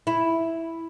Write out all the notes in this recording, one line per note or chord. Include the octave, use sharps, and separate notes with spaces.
E4